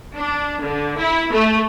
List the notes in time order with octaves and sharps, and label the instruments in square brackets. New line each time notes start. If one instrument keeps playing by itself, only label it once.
[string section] D4
D3
E4
A3